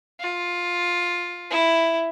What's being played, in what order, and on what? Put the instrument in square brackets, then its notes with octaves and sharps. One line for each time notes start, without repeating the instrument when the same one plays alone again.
[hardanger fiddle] F4
E4